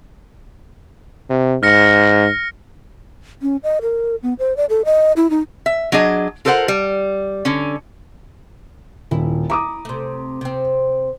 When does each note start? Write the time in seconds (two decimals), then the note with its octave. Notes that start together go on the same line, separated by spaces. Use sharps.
1.30 C3
1.63 G#2 F6 A#6 C#7
3.42 C#4
3.63 D#5
3.82 A#4
4.23 B3
4.39 C5
4.57 D5
4.69 A4
4.85 D#5
5.17 E4
5.30 D#4
5.66 E5
5.92 F#3 D4 G#4 D#5
6.45 F4 A4 A#4 C5 D5 F#5
6.68 G3
7.45 D3 C#4
9.11 D#1 E4
9.50 E4 A#5 D6 D#6
9.85 C3 A3
10.41 C3 C4